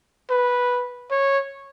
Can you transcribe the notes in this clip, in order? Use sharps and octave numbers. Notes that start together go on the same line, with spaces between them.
B4
C#5